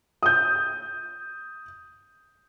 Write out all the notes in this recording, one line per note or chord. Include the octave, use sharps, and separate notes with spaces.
D#6 G6